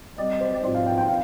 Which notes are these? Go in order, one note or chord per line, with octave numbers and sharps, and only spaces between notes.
G3 C4 G4 D5 D#5
C5
G#2 F3 C4 F4 D5
F5
G5
G5
F5